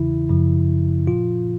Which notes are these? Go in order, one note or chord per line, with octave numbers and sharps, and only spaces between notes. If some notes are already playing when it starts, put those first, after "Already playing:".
Already playing: E2 C#3 E3 E4
F#2 C#3 F3
A#2 F3 F4